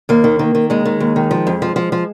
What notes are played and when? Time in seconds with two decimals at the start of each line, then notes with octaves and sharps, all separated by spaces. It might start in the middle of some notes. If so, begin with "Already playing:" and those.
0.09 D#2 A#3
0.24 D#3
0.39 D#3
0.55 D#3
0.70 D#2 G#3
0.85 D#3
1.00 D#2
1.16 D#3
1.31 F3
1.47 F2
1.62 F3
1.76 F3
1.92 F3